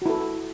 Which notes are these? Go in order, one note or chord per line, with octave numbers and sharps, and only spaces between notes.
E4 F#4 A4